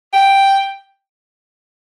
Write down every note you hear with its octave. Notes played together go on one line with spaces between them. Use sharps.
G5